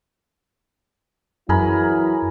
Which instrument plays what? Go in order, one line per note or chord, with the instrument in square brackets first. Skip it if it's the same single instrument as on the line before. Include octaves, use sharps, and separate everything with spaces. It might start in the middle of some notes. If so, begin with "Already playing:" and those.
[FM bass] F#2 [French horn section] E3 F#3 E4 [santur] G#4 A#4 B5